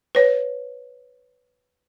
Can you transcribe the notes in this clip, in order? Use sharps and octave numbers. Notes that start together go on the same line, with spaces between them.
B4 C#5